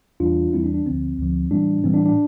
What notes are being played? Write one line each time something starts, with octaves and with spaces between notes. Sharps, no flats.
E2 E3 G3 D4 F4
E2 E3 G3 C4 E4
D4
D4
D2 D3 F3 C4
D2 D3 F3
A2 E3 G3 D4
A2 E3 G3 C4
D4
D4